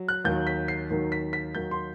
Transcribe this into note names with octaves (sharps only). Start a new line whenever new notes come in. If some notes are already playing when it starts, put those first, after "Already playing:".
Already playing: F#3
F#6
D#2 D#3 F#3 G6
B6
C7
D#2 D#3 F#3
B6
B6
D#2 D#3 F#3 G6
C6